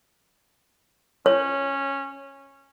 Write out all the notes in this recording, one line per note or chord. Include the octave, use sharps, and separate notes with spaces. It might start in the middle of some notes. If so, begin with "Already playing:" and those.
C#4 C#5